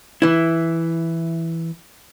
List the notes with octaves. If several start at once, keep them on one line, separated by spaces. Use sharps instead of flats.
E3 E4